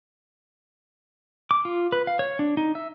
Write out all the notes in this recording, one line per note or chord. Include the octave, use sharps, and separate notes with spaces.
D6
F4
B4
F5
C#5
D4
D#4
E5